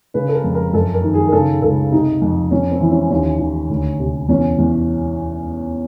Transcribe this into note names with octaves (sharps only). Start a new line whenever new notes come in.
C#3 B4
A4
A#4
F2
A#4
F#2 A4
A#4
D#3
G#4
A#4
C#3 A4
C#2 A4
C3 D#4
F2
F2 C#4
C4
E3
C#4
D#2 C#4
D#2
D2
C3
E2 C#4
E2